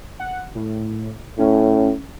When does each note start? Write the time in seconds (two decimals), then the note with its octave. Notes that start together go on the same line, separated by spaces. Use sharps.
0.20 F#5
0.55 A2
1.39 A2 C#4